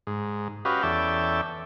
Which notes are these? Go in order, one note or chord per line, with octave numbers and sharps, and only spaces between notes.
G#2
C#4 F#4 G4 B4 D#5 F5
E2 C#4 A4 D5 E5 G5